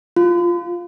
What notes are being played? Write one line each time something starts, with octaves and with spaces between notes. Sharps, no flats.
F4